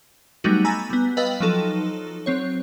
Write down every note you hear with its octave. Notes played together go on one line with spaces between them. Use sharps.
F#3 G3 A3 B3 D#4 F#4
G#5 A#5 B5 E6 A6 A#6
G3 B3
B4 D#5 F5 G5 E6 A6
F3 F#3 D#4 A4
F#3 C4 C#5